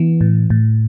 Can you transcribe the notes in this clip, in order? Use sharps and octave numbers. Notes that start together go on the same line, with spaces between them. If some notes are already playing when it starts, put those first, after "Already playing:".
Already playing: E3 B3
A2
A2